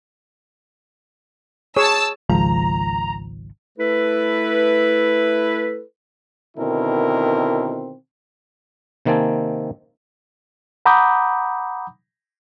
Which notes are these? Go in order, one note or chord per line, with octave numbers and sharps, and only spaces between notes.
G#4 C#5 A5 E6
G#1 C#2 F3 A#5
A3 E4 A4 B4
B2 D3 D#3 C4 E4 A#4
C3 D#3 A#3 C4 G#5 A5
F#5 A#5 B5 D6 D#6 G6